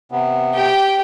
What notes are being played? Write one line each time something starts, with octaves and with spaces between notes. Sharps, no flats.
C3 B3
G4 G5